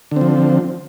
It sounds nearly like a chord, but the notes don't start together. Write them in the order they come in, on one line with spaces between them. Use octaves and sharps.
D3 C4 F3